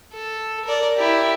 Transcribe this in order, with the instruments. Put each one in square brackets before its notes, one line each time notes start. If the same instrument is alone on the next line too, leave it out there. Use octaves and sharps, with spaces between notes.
[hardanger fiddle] A4
A#4 D5
E4 G4